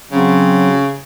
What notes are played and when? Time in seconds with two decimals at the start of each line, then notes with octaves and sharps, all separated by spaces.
0.12 C#3 F#3 C4